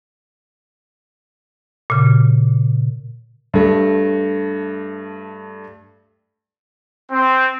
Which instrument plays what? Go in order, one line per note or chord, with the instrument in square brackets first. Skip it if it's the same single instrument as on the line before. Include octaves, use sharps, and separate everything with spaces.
[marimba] A#2 C#3
[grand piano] G2 A3
[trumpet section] C4